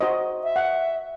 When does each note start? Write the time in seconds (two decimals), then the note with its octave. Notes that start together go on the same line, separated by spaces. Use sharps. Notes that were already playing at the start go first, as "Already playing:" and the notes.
0.01 F#4 C5 D#5
0.43 E5
0.56 F#5